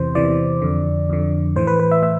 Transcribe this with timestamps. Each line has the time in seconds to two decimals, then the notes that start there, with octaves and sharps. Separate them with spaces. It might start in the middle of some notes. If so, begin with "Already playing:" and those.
Already playing: E2 C3 E3 C5
0.15 E2 C3 E3 D5
0.62 F2 D3
1.09 F2 D3
1.56 A2 E3 C5
1.67 B4
1.79 B4
1.91 E5
2.02 A2 E5